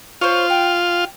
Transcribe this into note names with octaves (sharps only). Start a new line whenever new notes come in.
F4 C5 C#5
G5